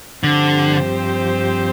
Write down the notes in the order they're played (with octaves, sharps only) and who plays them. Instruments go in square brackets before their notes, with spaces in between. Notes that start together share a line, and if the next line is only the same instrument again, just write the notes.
[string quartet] G2 F3 C4 G4 C5 [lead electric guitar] D3